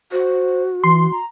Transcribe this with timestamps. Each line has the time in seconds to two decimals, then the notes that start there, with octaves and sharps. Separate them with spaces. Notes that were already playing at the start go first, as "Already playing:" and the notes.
0.12 F#4 C5
0.84 E3 C6
1.12 A#5